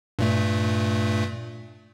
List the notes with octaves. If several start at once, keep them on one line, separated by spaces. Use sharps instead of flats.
G2 A#2 A3